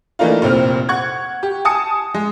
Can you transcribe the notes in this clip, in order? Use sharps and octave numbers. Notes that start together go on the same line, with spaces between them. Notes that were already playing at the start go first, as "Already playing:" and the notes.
E3 A3 A#3 D4 D#4 F4
F1 A#2 C4 F6
F#5 C#6 F#6 G#6
G4
G#5 A5 D#6 C#7
G#3